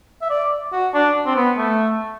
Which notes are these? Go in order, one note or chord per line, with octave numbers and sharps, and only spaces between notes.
E5
D5
F#4
D4
C4
B3
A3